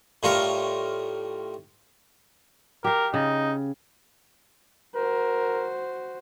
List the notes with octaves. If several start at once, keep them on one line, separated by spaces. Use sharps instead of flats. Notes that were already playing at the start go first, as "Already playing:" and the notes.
A2 G3 F4 A#4 C#6
G4 A#4 F5
C#3 D#4
F#4 A#4 C5